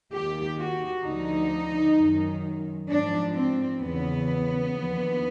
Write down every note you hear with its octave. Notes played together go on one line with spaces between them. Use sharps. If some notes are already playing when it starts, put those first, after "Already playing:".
D#2 D#3 G4
F#4
D2 D3 F3 D#4
F#2 D#3
G#2 F3 D4
C4
E2 C#3 E3 B3
D#2 D3 F3